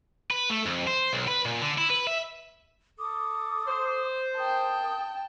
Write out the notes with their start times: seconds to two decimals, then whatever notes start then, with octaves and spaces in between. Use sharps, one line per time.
0.31 B4
0.50 A3
0.66 F2
0.87 C5
1.13 B1
1.28 B4
1.45 A#2
1.61 D3
1.78 E4
1.90 B4
2.07 E5
2.99 A4 D6 D#6
3.67 C5
4.36 A#4 G5 A5 D#6